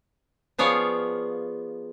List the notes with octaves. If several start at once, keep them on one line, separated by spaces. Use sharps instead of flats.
F3 B3 G#4 C#5 D5 F5